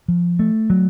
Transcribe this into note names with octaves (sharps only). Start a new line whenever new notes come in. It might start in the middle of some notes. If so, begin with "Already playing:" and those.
F3
A3
F#3